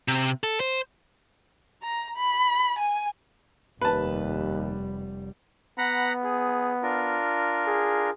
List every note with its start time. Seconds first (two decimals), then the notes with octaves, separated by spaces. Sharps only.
0.08 C3
0.44 A4
0.60 C5
1.83 A#5
2.16 B5
2.79 G#5
3.82 F1 D#2 G3 B4 A5
5.78 B3 F#5 A#5 B5
6.24 G#4
6.82 D4 F4 A#4
7.66 G#4